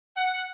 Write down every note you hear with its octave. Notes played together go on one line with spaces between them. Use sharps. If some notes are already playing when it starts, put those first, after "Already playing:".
F#5